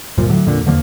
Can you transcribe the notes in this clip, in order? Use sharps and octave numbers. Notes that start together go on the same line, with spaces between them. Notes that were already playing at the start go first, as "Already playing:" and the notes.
D2 G2 A#2 F3
A2 D3 F#3
A#1 F2 A#2 D3
E2 D3 F3 A#3